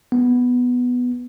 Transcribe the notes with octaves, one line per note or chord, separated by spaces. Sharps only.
B3